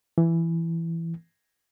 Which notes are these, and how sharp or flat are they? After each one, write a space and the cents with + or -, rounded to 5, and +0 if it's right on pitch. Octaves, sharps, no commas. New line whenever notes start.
E3 +10